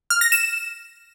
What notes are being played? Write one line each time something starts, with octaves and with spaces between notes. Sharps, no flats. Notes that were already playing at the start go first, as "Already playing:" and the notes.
F6
A#6
E7